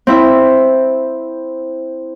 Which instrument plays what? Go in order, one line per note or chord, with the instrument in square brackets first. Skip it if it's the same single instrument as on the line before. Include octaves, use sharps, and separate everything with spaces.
[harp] C4 E4 E5 E6